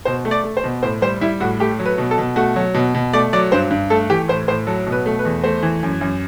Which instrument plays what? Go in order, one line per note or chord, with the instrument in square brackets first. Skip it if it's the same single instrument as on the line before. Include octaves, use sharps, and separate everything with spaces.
[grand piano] B2 C5
A3
D5
A3
C5
B2
A2 C5
G3 C5
G3 E4
A2 F#4
A3 G4
F#3
B4
B2
A4
B2
A3 F#4
F#3
B2
B2
A3 D5
F#3 D5
G2 C5
G2
A3 A4
E3 G4
A2 C5
A2 C5
F#3 A4
B2
B4
A3
B4
E2
A3 C5
E3
F#2
F#2